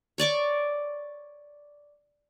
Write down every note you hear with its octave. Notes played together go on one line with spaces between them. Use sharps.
C#5 D5 C#6 D6